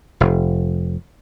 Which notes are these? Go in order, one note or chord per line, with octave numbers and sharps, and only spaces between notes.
F1